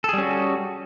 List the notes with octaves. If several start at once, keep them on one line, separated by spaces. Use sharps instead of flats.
G3 C#4 F#4 G#4 A4